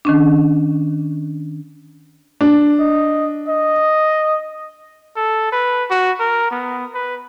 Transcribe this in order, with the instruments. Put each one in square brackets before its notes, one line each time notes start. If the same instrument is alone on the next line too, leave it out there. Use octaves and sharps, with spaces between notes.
[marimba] D#3 C#4 D4
[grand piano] D4
[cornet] D#5
D#5
A4
B4
F#4
A#4
B3
B4